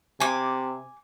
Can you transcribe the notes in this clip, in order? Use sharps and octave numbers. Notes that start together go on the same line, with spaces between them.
C3 G#5 D6